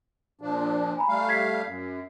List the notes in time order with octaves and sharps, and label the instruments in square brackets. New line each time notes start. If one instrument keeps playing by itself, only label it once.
[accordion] A#2 F3 D4
[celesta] G#5 A#5 B5
[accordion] G3 A3 F5
[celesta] G#6 B6 C7
[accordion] F#2